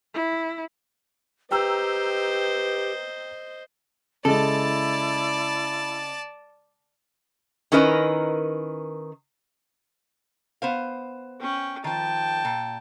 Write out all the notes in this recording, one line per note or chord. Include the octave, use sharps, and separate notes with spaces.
E4
G4 B4 C5 D#5 G5 A#5 E6
C#3 G#3 E4 A4 D5 A5
D#3 C#4 E4 A#4 B4 D#5
B3 C5 F5
C#4 G5
D#3 F3 G5 A5
A#2